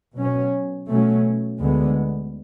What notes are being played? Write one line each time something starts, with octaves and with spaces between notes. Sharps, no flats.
B2 F#3 C#4
B2 F#3 A3 C#4
D2 D3 G#3 B3